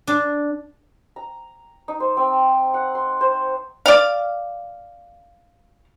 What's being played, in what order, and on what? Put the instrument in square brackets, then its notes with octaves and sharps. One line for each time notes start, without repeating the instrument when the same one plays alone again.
[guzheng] D4
[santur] A#5
D#4
C5
C4
F#5
C6
C5
[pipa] D5 F5